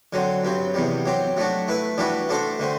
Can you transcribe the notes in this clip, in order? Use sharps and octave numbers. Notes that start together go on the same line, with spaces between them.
D3 F#3 C4
G2 F#3 C4
E2 C3 G3
F#3 C4 G4
F#3 A3 D4 F#4
A3 E4 B4 E5
E3 G3 D4 F#4 B4
A3 D4 F#4 A4 C5
D3 A3 C4